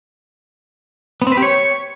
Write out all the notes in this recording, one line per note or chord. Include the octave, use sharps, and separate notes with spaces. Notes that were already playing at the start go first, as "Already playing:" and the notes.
B3
C4
B4
G4
C#5